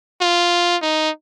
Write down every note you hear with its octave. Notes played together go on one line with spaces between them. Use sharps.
F4
D#4